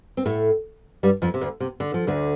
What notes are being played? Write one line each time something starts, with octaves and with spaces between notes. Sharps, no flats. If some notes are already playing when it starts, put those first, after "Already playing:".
C4
A2 A3
G2 G3
F2 F3
C3
D2 D3
C3
D3
F3
D2 D3